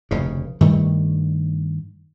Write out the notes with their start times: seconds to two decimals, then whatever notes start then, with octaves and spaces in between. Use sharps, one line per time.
0.11 F1 D2 C#3
0.61 G2 D#3 G3 A3